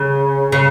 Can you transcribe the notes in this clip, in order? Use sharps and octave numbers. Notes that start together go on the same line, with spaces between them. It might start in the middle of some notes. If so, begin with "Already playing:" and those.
Already playing: C#3
C#3